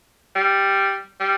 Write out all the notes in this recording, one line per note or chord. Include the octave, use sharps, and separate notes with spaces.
G3
G3